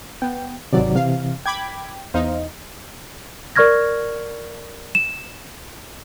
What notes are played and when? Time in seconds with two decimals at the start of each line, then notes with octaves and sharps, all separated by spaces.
0.22 B3 G5
0.73 G#1 C3 D#3 F#3 D5
0.95 C3 E3 F5
1.46 G5 B5 D6 G#6
2.14 E2 D#4 C5 F5
3.56 A#4 D5 C#6 F6 G#6 A#6
4.95 E7